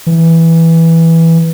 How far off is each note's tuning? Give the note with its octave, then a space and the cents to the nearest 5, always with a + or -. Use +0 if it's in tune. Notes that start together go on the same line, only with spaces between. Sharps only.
E3 -5